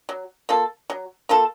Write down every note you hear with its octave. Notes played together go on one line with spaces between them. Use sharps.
F#3
A#3 F4 A4
F#3
A#3 F4 A4